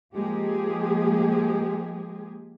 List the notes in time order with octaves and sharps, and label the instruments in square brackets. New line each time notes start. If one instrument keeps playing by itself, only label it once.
[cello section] F3 G#3 A#3 G4 G#4